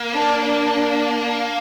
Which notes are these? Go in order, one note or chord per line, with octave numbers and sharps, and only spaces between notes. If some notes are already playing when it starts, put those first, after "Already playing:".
Already playing: A#3
D4
D4